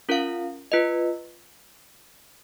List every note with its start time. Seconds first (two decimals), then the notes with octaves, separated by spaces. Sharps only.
0.09 C#4 F4 A#4 F5
0.72 F4 B4 D#5